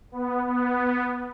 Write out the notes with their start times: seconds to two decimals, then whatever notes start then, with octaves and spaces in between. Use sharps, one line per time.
0.12 B3
0.47 B3